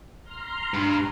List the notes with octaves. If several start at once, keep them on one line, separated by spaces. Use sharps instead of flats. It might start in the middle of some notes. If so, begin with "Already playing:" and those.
A#5 C6 F6
G2